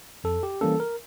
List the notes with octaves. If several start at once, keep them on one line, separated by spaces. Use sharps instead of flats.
F2 A4
G4
E3 G3 A#3 C#4 A4
A#4